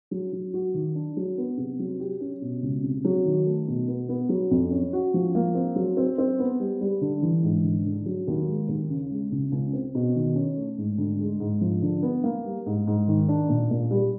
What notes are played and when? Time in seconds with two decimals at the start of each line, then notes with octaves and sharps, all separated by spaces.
0.11 F#3
0.33 F#3
0.54 F#4
0.74 D#3
0.95 D4
1.17 F#3
1.38 B3
1.57 C3
1.79 F#3
2.00 G4
2.21 C#4
2.42 B2
2.62 C#2
2.83 C3
3.05 F#3
3.25 D#3
3.46 A3
3.68 B2
3.88 B3
4.09 B3
4.29 F#3
4.51 F2
4.71 C#4
4.93 F#4
5.14 F3
5.35 A#3
5.55 C4
5.76 F#3
5.97 C4
6.18 C4
6.39 B3
6.60 G3
6.81 G3
7.01 D3
7.22 E3
7.43 G#2
7.64 D3
7.86 D3
8.06 F#3
8.27 D#2
8.47 G#3
8.69 D#2
8.89 C#3
9.10 G#3
9.31 C#2
9.52 C#2
9.73 C4
9.95 B2
10.16 D#3
10.35 C#4
10.57 A3
10.78 G#2
10.98 D2
11.19 G#3
11.40 G#2
11.61 F3
11.82 D3
12.02 B3
12.24 A#3
12.45 G3
12.66 G#2
12.87 G#2
13.08 D#3
13.28 D4
13.49 A#2
13.71 A#2
13.91 G3